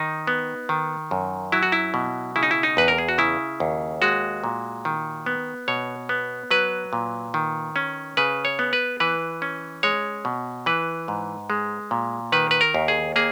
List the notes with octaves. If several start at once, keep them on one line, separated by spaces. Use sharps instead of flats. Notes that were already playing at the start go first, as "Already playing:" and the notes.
Already playing: D#3 D#4
B3
D#3
F#2
F#3 E4
F#4
E4
B2
C#3 E4
D#4
E4
D#4
E2 B4
A#4
G#4
F#4
C#3 E4
D#2
G#3 F#4
A#2
D#3
B3
B2 C#5
B3
F#3 B4
A#2
D#3
C#4
C#3 B4
C#5
B3
B4
E3 B4
C#4
G#3 C#5
B2
E3 B4
G#2
G#3
A#2
D#3 B4
B4
A#4
D#2
G#4
A#3 G#4